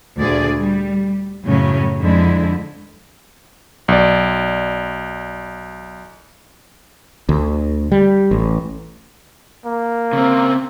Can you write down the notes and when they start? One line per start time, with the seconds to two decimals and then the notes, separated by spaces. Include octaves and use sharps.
0.19 D2 A#2 G#4 D5
0.58 G3
1.44 F#2 A2 C#3 F#3 C#4
2.00 F2 D3 G#3 E4
3.88 B1 D5
7.29 D2
7.92 G3
8.31 A1
9.65 A#3
10.13 C#3 C4